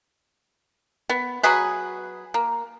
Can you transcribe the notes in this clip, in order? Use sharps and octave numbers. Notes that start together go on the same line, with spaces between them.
B3
F#3 F#4 G#4 B4
A#3